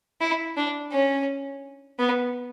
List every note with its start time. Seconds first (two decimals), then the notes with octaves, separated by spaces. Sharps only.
0.21 E4
0.57 D4
0.92 C#4
1.99 B3